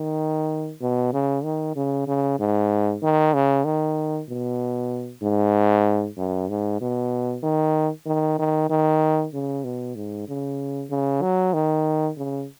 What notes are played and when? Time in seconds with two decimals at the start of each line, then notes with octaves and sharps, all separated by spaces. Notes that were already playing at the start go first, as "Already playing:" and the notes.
Already playing: D#3
0.81 B2
1.13 C#3
1.44 D#3
1.76 C#3
2.07 C#3
2.39 G#2
3.03 D#3
3.34 C#3
3.65 D#3
4.29 B2
5.23 G#2
6.17 F#2
6.49 G#2
6.81 B2
7.43 D#3
8.06 D#3
8.39 D#3
8.70 D#3
9.34 C#3
9.64 B2
9.96 G#2
10.28 C#3
10.90 C#3
11.22 F#3
11.54 D#3
12.17 C#3